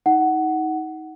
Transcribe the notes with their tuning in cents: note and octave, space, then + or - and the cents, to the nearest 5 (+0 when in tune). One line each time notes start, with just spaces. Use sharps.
D#4 +25 F#5 +10